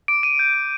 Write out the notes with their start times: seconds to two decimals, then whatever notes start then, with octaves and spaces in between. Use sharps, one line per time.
0.08 D6 D7
0.23 D6 D#7
0.39 G6
0.54 G6